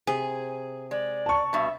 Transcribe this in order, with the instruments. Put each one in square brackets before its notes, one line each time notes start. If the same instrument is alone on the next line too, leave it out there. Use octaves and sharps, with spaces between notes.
[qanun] C3 [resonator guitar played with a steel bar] G#4
[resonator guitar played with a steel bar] G#3 [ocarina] D5
[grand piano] A5 C#6
[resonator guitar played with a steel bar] G2 B2 [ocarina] E5